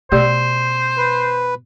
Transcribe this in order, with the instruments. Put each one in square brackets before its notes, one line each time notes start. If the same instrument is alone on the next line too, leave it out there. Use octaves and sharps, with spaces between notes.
[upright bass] B2 [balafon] A3 G4 D5 [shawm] C5
[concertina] B4